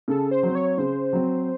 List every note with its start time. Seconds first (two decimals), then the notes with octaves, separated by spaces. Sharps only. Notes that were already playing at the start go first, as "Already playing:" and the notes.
0.08 C#3 A4
0.31 C5
0.43 F#3 C4
0.55 C#5
0.78 C#3 C5
1.13 F#3 C4